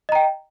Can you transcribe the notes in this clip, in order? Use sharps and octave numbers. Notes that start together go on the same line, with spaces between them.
D#5 G5 A#5